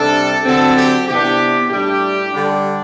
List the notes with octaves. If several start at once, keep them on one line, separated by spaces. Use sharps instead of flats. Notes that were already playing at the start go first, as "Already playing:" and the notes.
Already playing: C3 G3 D4 A4
D3 F#3 C4 A4
G4
C3 E3 B3 D4 G4
A2 G3 D4 G4
D3 G3 D4